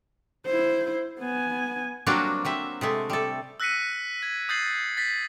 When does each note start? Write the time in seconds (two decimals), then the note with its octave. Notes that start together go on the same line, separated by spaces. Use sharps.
0.46 E4 C5
1.19 B3 G#5
2.06 F#3 G3 A#3 C4 D4 F#4
2.45 F#3 C4 E5
2.81 C3 G#3 A3
3.10 G3 A4
3.60 E6 F#6 A#6 B6 C#7 D#7
4.23 G#6
4.49 D#6 G6 A6 C7 F#7
4.97 A6 B6